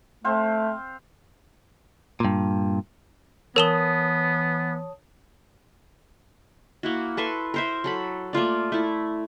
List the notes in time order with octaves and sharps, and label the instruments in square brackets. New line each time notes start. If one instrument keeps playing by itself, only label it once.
[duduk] A3 [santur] C4 C5 F5
[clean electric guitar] G2 A#2
[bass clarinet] E3 [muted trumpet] B3 [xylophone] A#4 E7 G7 [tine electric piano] C#5 A5 D#6
[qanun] A#3 E4 F#4
A4 B4 E5 C6
A#4 C5 E5
F#3 A4 B5
A3 A#3 F4 D5
A3 E4